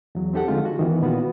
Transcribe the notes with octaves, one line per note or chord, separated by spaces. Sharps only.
E2 F#3
C4 D#4 G4 A4 F#5
D3 F3 G#3 F4
F#4
D#3 E3 B3
A#2 B3 F4 F#4